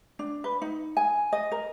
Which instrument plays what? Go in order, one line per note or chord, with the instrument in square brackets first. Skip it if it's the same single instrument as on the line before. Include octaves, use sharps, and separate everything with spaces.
[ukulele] D4
B4
D#4
G#5
D#5
A#4